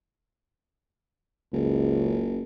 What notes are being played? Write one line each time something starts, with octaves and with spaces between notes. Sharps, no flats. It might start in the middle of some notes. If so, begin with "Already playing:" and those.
F#1 C#2